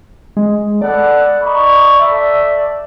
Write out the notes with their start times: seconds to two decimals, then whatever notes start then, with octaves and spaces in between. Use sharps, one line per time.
0.37 G#3
0.82 B3 A4 D5 F#5
1.42 D#4 B5 C#6
1.99 A3 E5